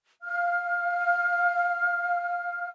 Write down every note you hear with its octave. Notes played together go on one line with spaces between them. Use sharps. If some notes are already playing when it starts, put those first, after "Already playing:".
F5 F6